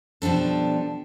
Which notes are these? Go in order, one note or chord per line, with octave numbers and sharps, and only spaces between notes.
B2 F3 G3 D4 A4